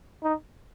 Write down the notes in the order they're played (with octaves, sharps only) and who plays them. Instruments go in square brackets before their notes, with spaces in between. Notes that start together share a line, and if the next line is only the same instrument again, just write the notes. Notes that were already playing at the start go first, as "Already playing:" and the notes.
[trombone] D#4